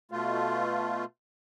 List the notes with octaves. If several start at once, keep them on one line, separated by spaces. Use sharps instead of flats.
B2 A3 F4